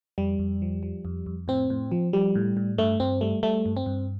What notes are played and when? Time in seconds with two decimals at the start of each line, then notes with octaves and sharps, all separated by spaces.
0.18 F2 G3
0.39 F2
0.62 F3
0.83 F3
1.05 F2
1.26 F2
1.48 A2 C4
1.70 A2
1.91 F3
2.13 F3 G3
2.36 A2
2.57 A2
2.78 G2 A3
3.00 G2 C4
3.21 G3 A3
3.43 G3 A3
3.66 G2
3.77 C4
3.86 G2